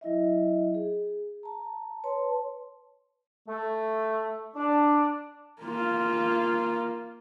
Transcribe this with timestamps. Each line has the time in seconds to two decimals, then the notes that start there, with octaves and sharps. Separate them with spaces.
0.01 F#3 E4 D#5 E5
0.74 G#4
1.43 A5 A#5
2.04 B4 C#5 A5 C6
3.47 A3
4.55 D4
5.62 A#3 F4